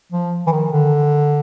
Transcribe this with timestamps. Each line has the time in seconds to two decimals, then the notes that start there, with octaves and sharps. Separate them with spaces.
0.12 F3
0.47 E3
0.52 D#3
0.72 D3